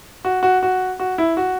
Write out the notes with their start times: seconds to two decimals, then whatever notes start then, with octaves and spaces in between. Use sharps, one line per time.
0.25 F#4
0.43 F#4
0.63 F#4
0.99 F#4
1.18 E4
1.37 F#4